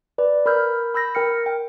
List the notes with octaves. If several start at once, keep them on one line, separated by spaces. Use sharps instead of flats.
B4 D5
A#4 B5 E6 F6 G6
B5 E6 G6 A#6
A#4 G5 F6 C#7
G5